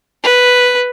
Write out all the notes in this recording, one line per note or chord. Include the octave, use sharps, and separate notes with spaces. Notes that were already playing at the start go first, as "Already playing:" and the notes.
B4